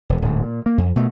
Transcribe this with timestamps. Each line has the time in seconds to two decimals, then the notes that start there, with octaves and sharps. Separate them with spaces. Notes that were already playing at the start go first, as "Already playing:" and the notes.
0.09 E1
0.22 D1 G#2
0.42 A#2
0.66 A#3
0.78 F2
0.96 B2 A3